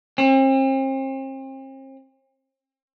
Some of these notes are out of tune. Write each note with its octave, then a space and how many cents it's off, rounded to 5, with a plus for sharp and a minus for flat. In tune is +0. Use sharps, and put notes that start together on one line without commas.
C4 +40